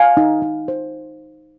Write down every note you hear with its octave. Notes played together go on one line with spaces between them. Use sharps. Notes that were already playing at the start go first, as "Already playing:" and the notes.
Already playing: F5 G#5
D#4
D#4
C5